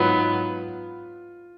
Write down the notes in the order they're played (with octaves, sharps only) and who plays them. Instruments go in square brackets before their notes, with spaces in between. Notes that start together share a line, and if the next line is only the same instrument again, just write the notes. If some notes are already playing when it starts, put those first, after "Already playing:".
Already playing: [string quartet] G#2 F#3 B3 D#4 [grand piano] F4